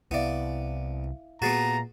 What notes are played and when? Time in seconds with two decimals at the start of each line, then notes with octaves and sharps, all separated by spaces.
0.11 C2 B3 E4 D5 E5 F5
1.42 A#2 A3 B3 F#4 G#4 A#5 A6 C7